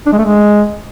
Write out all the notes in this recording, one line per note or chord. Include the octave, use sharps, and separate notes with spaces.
D4
G#3
A3
G#3